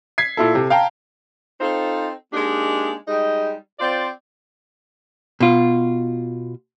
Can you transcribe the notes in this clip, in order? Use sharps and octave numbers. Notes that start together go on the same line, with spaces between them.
G#6 B6 C7
A#2 E4 A4
C3 A4
F5 G5 A5 A#5
C4 D#4 F4 A4 C5
G#3 A#3 D4 D#4 G4
G3 G#3 D#4 D#5
C4 F4 C5 D5
B2 F4